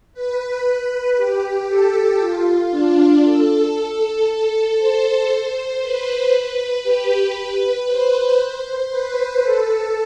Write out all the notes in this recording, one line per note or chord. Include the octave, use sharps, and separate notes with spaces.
B4
B4
G4
A4
F4
D4
A4
C5
C5
B4
B4
G4
B4
C5
B4
A4